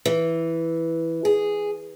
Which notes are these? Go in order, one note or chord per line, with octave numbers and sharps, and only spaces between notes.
E3
G#4